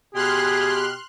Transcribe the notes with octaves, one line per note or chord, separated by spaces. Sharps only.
B2 G4 G#4 C6 F6 F#6